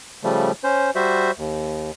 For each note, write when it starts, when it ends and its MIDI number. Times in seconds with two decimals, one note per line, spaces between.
0.24 0.52 49
0.24 0.52 53
0.24 0.52 55
0.24 0.52 57
0.64 0.90 61
0.64 0.90 72
0.95 1.31 55
0.95 1.31 66
0.95 1.31 72
0.95 1.31 76
1.38 1.91 39